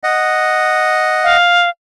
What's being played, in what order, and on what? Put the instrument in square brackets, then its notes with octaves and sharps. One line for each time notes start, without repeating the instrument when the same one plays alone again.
[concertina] D#5 F#5
[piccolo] F5